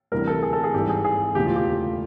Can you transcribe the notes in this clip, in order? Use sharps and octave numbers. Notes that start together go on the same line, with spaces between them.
D2 C3 E3 G3 A#4
A4
G#4
A4
G#4
G#1 G2 E3 G4
G#4
G#4
E1 D2 C#3 E3 A3 G4
F4
G4